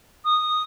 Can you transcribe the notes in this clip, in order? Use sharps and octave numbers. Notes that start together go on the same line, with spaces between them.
D#6